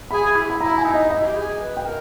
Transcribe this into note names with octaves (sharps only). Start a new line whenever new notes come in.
G#4 B5
E4
B5
E4 A#5
G#5
D#4
D#5
E4 D#5
G4
G#4
B4
G5
A#4